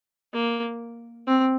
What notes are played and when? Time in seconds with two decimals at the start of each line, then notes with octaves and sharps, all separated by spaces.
0.33 A#3
1.28 C4